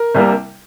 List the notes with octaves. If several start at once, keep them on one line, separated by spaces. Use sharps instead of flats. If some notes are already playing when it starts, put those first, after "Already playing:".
Already playing: A#4
C2 C3 G3 A#3